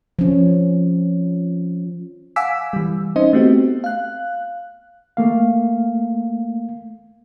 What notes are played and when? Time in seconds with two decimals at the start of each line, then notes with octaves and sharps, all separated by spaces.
0.19 F3 C#4
2.36 F5 F#5 G#5 D6 E6 B6
2.73 E3 G3
3.16 C#4 D#4 C5 D#5
3.33 A3 B3 C4 F#4 G4
3.84 F5 F#6
5.17 A3 A#3 F5